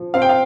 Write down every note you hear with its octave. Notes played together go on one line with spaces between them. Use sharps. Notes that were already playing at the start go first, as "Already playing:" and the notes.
Already playing: F3
C4 F5
G5
F5